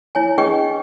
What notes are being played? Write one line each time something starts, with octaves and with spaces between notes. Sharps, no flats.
E4 C#5 G#5
D4 G#4 B4 D#5 G5 C#6